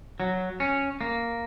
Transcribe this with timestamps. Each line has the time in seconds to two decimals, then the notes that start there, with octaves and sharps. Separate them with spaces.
0.20 F#3
0.60 C#4
1.01 A#3